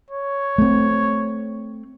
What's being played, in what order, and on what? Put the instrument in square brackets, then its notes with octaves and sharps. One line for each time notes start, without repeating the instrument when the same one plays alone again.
[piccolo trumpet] C#5
[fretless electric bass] A3 C4